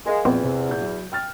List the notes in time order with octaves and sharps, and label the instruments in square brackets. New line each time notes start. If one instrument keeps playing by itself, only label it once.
[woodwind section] G#3 [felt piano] A#4 D#5 F5
[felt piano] A#1 F3 [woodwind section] E2 [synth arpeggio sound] B3 C4
[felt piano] C3
A#2 F3 G6
F#3
G5 F6 A6